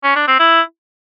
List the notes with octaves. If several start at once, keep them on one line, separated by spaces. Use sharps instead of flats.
C#4
D4
C4
E4